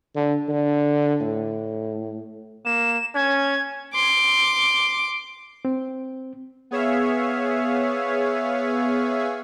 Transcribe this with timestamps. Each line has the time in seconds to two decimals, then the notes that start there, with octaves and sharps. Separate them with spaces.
0.16 D3
0.48 D3
1.21 A2
2.65 A#3 E7
3.15 C#4 G#6
3.94 C6 D6
5.65 C4
6.71 B3 G#4 C#5 E5 F5